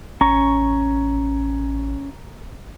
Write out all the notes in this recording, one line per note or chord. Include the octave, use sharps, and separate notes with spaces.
A1 C#4 A#5 C#6